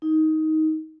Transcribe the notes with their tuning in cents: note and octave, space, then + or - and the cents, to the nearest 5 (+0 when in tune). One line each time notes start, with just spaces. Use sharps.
D#4 +15